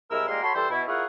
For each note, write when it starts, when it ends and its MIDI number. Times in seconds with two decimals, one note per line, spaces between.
0.11 0.28 36
0.11 0.28 56
0.11 0.28 64
0.11 0.28 70
0.11 0.28 88
0.28 0.42 55
0.28 0.42 56
0.28 0.42 58
0.28 0.42 65
0.28 0.42 70
0.28 0.42 84
0.43 0.53 66
0.43 0.53 69
0.43 0.53 73
0.43 0.53 83
0.43 0.53 84
0.55 0.67 52
0.55 0.67 55
0.55 0.67 69
0.55 0.67 72
0.70 0.82 47
0.70 0.82 64
0.88 1.04 64
0.88 1.04 65
0.88 1.04 68
0.88 1.04 70
0.88 1.04 73
0.88 1.04 78